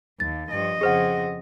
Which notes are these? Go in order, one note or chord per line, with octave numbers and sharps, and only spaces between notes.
D#2 A6
G2 F3 D#5
F2 C#3 G#4 C5 F#5